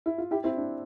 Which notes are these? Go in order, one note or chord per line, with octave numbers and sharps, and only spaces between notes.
E4
F4
E4 G4
C4 E4
D4